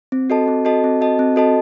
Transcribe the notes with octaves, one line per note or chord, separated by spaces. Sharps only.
C4
F#4 A4 D#5 A5
C4
F#4 A4 D#5 A5
C4
F#4 A4 D#5 A5
C4
F#4 A4 D#5 A5